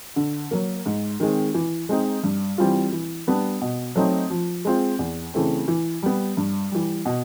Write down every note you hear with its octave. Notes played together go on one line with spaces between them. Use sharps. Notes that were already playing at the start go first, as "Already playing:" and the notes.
D3
F#3 A#3
G#2
D#3 G#3 C4
E3
G#3 C4 D#4
G2
E3 G3 C4 F4
E3
G3 B3 D4
B2
F#3 A3 C4 D#4
F3
G#3 C4 F4
E2
C#3 E3 A3 C4
E3
G3 B3
G2
E3 G3
B2